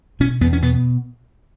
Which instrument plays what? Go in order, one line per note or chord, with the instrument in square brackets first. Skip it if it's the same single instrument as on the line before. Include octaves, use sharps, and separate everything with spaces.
[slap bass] B2 C#4
E2 B3
C#4
B2 B3